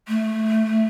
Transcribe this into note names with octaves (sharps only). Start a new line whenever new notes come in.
A3